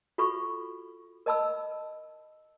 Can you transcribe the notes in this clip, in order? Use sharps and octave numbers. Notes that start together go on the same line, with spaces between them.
F4 F#4 A4 B5 C#6
A#4 D#5 A5 B5 E6